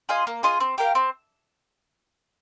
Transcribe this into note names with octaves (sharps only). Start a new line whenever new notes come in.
F4 G#4 D#5
A#3
F4 G#4 D#5
C4
G4 A#4 F5
C4